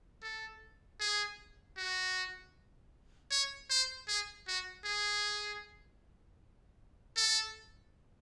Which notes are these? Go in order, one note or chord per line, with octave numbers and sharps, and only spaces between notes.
A4
G#4
F#4
C#5
C5
G#4
F#4
G#4
A4